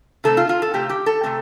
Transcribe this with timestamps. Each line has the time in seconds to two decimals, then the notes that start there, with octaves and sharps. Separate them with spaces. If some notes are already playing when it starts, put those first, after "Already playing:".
0.24 C3 A3 C4 A4
0.37 F4
0.49 F4
0.62 A4
0.73 C3 A3 C4 G4
0.90 G4
1.06 A4
1.23 C3 A3 C4